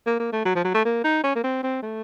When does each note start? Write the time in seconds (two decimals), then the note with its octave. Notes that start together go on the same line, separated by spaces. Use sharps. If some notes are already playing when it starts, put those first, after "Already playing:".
0.06 A#3
0.19 A#3
0.32 A3
0.45 F#3
0.55 F3
0.64 F#3
0.74 A3
0.85 A#3
1.04 D#4
1.24 C#4
1.36 A#3
1.44 C4
1.63 C4
1.82 A3